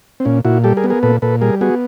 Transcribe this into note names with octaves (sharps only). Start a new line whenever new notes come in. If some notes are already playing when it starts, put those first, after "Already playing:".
C4
A#2 C#4
A#2 E4 F#4
G3 G4 A4
G#4 A#4
B3
G#4 A#4
A#2 A4 B4
A#2 A4 B4
G3 G#4 A#4
B3 F#4 G#4